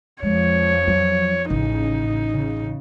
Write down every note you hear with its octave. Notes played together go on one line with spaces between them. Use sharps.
F2 F3 G#3 C#5
F#3
A1 A2 C#3 D#4
C#3